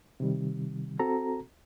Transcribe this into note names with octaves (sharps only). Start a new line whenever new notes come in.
C3 D#3 G3
C4 F#4 A4 A#5